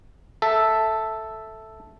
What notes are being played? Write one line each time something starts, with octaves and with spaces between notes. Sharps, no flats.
A4 E5